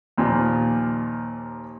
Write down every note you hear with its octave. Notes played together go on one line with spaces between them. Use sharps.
D#2 A#2 F3